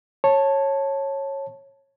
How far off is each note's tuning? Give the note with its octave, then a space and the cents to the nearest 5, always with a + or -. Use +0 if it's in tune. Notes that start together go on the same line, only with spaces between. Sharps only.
C#5 -15 A5 +0